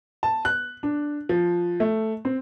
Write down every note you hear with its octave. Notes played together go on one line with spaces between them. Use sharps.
A5
F#6
D4
F3
A3
C4